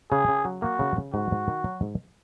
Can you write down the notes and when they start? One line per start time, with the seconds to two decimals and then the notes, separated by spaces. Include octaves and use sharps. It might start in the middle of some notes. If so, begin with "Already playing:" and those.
0.11 C#3 G#4
0.28 C#3
0.45 F#3
0.62 A#3 F#4
0.79 C#3
0.96 C#3
1.13 G#2 F#4
1.31 G#2
1.48 D#3
1.64 F#3
1.82 G#2